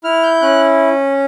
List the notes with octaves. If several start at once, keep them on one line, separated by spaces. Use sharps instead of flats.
E4 F6
G6
C#4 F#6